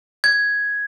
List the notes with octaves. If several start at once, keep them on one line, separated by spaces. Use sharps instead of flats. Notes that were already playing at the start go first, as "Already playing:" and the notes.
G#6